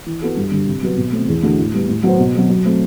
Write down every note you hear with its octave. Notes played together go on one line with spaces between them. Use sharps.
E3
B3 F#4 A4
G2
D3 G3
C3
F#3 B3 F#4 B4
B2
A3 C4
E2
D3 A3 D4 F#4
A2
G3 B3
A2
F#3 B3 F#4 C5
B2
F#3 C4
F#3
A3 C4